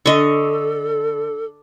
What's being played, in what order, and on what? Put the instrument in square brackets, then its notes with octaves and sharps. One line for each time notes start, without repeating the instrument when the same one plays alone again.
[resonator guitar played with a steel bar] D3 [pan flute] A4 [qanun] D#5 C#6